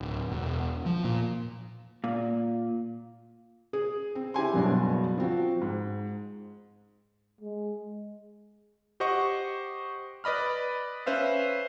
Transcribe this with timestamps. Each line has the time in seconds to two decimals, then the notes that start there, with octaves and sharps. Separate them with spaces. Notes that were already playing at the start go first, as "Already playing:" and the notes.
0.01 D1
0.30 E1
0.86 F3
1.04 A#2
2.04 A#2
3.73 G#4
4.15 C4
4.34 E4 G4 G#5 C6
4.53 F#1 G2 B2 F#3 D4
5.18 F3 C4 F#4
5.62 G#2
7.41 G#3
9.00 G4 C5 D#5 F#5 C#6
10.24 B4 D5 D#5 B5 F6
11.06 C#4 B4 C5 E5 F5